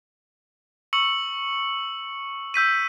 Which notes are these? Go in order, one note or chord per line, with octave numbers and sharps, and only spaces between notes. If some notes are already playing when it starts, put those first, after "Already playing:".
C#6 E6 C#7 F#7
E6 G6 B6 D#7